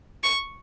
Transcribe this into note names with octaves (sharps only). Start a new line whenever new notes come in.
C#6